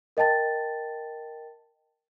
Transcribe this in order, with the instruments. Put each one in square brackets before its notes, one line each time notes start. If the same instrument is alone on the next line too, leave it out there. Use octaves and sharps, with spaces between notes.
[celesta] A#4 D#5 G5 A5 A6